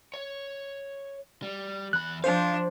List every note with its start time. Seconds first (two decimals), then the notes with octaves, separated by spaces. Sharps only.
0.14 C#5
1.42 G3
1.93 E2 B5 F#6
2.24 F3 D4 C5 F5